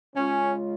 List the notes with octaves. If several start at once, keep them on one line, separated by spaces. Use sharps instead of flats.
C#3 G#3 C#4 F4